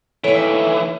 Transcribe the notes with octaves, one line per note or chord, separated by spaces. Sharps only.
D#2 E3 A3 C#5 E5